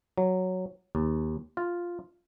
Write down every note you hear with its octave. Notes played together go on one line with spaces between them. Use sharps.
F#3
D#2
F4